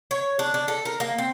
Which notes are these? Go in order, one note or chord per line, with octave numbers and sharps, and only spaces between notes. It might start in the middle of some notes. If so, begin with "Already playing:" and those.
C#5
D4
D4
A4
A#4
A#3
C4